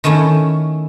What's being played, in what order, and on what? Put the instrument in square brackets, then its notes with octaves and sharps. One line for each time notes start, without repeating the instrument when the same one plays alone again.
[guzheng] D#3 A3 C#4 E4